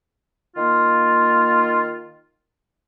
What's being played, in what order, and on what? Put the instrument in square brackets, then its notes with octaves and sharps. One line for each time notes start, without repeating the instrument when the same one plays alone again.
[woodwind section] D#3 A#3 F4